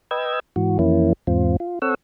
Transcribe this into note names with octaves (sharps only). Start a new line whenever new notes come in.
B4 D#5 G5 E6 G#6
G#2 E3 F#4
F2 E3 A#3 C#4 E4
E2 G#2 C4 F4
F4
C4 A4 C#5 F#5 E6